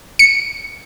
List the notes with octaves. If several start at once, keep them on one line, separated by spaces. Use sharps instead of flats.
C#7